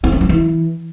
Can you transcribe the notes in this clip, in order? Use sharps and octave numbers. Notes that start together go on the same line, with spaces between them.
C4
C#4
F3
E3